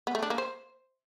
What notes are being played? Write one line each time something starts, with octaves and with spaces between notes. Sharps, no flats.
B3
A3
D4
A#3
C5